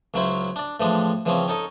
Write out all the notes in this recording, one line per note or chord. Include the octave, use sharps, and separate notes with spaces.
C#2 C#3 F#3 C#4 E4 C5
D4 D5
A2 E3 F3 G3 G#3 D4
C#3 E3 F3 G3 C4 C#4
C#4 D#4 A4 D#5